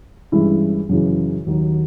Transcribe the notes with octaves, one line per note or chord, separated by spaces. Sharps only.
G2 E3 G#3 C#4 E4
F#2 C#3 E3
D#2 D#3 F#3